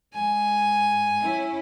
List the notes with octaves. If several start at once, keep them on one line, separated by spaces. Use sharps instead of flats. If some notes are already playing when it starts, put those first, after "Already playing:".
G#2 G#5
C#4 E4